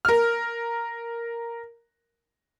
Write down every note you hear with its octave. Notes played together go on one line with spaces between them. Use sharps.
A#4 F6